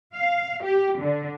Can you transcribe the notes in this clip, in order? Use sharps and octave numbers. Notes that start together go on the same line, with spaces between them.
F5
G4
D3